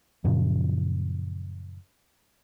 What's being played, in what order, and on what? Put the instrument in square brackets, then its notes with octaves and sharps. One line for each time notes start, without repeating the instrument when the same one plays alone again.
[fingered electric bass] F#2 A#2 C#3 F3